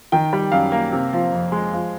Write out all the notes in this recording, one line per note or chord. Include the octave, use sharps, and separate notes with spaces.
D#3 G5
G3
F#2 F5
A#3
C3
F3
F2
G#3
F3